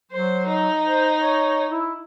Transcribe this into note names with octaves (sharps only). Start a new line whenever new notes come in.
F#3 C5
D#4
C5
C#5
E4